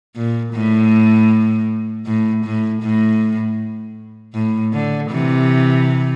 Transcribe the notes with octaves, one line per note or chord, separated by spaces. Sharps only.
A#2
A2
A2
A2
A2
A2
D3
C3 E3